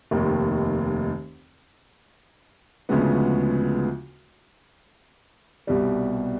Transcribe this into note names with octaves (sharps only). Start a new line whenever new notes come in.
F1 D#2 D#3
D2 C#3 F3 G#3 B3
C2 B2 G3